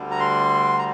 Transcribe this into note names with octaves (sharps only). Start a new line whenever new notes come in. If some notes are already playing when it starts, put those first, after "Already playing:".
Already playing: D2 D3 G3
A#5
C6
A#5